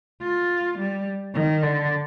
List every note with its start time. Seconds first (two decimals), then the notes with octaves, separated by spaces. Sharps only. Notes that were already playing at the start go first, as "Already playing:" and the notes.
0.21 F4
0.78 G3
1.35 D#3
1.62 D3